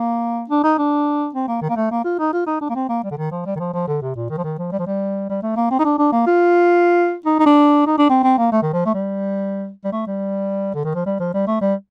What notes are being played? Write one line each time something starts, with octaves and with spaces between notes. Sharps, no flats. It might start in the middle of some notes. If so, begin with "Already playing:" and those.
Already playing: A#3
D4
D#4
D4
C4
A#3
D#3
A#3
A3
A#3
F4
D#4
F4
D#4
D4
A#3
C4
A#3
G3
D3
D#3
F3
G3
D#3
F3
F3
D3
C3
A#2
D#3
F3
D#3
F3
G3
F3
G3
G3
A3
A#3
C4
D#4
D4
D4
A#3
F4
D#4
D#4
D4
D#4
D4
C4
C4
A#3
A3
D#3
F3
A3
G3
G3
A3
G3
D3
D#3
F3
G3
F3
G3
A3
G3